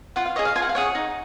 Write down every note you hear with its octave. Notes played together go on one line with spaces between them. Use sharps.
F4 F#5
F5
G#4 C#5 D#5
F5
F4 G#5
F#5
F5
G#4 C#5 F#5
D#4